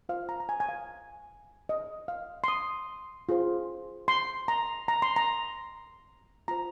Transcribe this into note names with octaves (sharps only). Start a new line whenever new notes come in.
F4 C5 F5
A#5
A#5
G#5
G#5
F5
D#5
F5
C6
D#6
F4 G#4 C5
C6
A#5
A#5
C6
A#5
F4 C5 A#5